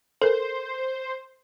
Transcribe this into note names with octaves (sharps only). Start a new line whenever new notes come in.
A4 A#4 C5